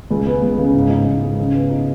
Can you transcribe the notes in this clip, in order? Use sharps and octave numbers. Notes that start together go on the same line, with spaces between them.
C#2
B3
C#2
C#3
G#2
D#4
G#2
G#3
C#3
B3
D#4